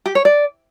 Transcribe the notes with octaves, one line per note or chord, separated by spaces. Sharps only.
G4
C#5
D5